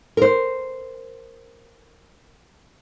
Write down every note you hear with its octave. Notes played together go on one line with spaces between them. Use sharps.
A#4 C5